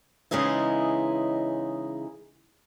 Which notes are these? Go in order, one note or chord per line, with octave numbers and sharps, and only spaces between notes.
C#3 E3 G#3 D#4 E4